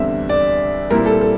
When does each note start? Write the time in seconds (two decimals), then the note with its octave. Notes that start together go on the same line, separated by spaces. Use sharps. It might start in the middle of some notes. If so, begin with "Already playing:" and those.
Already playing: E2 D3 G3 C4 E5
0.29 D5
0.90 A#2 G3 C4 E4 A#4
1.06 A4
1.21 A4